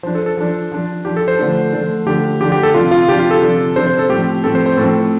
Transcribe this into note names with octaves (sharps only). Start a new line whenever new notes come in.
F3 D4 C5
A4
A4
F3 D4
F3 D4
F3 D4 G4
A4
C5
D3 F3 A3 D4
D3 F3 A3 D4
D3 F3 A3 D4 G4
D3 F3 A3 D4 G4
G4
A4
C3 F3 D4 F4
F4
C3 F3 D4 G4
F4
A4
C3 F3 D4
C3 F3 D4 C5
C5
A4
A2 F3 C4 G4
A2 F3 C4 A4
C5
C5
A2 F3 C4 A4